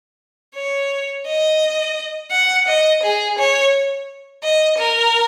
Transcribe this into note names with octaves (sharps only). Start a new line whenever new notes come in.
C#5
D#5
F#5
D#5
G#4
C#5
D#5
A#4